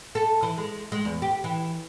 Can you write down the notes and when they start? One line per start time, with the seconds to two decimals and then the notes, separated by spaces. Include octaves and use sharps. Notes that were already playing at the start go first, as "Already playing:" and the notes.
0.15 A4
0.43 E3
0.57 G#3
0.92 G#3
1.05 E2
1.22 G4
1.44 E3